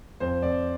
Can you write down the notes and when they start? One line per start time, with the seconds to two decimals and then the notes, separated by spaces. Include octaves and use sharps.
0.20 F2 C5
0.42 F2 D5